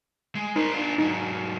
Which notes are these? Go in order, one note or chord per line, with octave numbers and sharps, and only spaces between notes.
G#3
D#4 A#4 C5
D4 F4
G#2 F#3 D#4